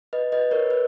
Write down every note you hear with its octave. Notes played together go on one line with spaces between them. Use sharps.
B4 D#5
B4 D#5
A#4 C#5
B4